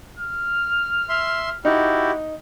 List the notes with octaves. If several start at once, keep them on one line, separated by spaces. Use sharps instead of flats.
F6
E5 C6
D#4 E4 F#4 G4